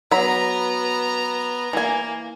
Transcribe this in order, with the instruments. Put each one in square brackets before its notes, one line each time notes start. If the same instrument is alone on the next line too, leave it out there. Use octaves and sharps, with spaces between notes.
[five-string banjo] F#3 B5 [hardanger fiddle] B3 A#5
[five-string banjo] E3 G#5 [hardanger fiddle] A#3